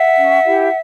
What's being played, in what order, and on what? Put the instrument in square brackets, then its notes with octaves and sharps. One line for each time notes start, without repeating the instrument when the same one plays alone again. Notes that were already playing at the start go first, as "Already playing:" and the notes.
Already playing: [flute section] E5 F#5
C#4
E4 G4